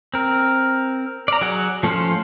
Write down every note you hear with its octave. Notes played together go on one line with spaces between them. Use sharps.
C4 A#4
D5 A#5
F#3 G#4 F#5
F3 A3 C#4 F4 C5